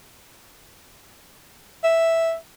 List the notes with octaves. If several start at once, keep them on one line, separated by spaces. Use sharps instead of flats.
E5